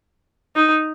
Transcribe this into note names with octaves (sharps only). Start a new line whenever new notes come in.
D#4